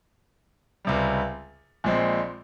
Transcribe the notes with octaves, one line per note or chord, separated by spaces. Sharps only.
C#2 C3 G3
A#1 A#2 G#3 C4